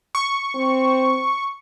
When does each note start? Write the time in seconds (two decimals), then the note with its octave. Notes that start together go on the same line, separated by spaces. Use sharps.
0.15 C#6
0.55 C4